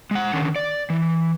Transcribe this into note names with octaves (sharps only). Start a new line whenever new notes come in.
G#3 F#5
D3 D#3 C#4
D5
E3